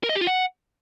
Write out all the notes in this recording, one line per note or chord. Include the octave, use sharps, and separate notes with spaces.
A#4
D#5
G4
F4
F#5